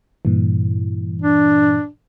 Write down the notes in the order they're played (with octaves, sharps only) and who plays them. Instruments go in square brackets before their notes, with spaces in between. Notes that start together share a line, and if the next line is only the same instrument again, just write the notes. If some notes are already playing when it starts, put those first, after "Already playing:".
[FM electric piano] G2 A#2 E3
[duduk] D4